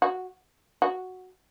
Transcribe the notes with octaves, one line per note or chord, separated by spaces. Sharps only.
F#4
F#4